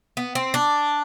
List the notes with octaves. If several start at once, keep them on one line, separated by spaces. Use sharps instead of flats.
B3
C4
D4